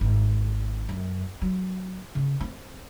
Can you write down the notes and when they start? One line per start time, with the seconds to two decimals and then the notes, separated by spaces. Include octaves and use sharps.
0.01 G#1
0.89 F#2
1.42 F#3
2.15 C#3
2.40 C4